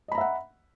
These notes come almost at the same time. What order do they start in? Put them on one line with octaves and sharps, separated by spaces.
D#5 B5 A#5 E5 F#5